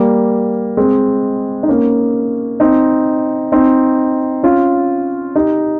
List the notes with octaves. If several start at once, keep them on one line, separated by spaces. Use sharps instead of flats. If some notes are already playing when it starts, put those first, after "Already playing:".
Already playing: G3 A#3
G#3 C4
D#4
A#3 C#4
C4 D#4
C4 D#4
C#4 F4
D#4 G4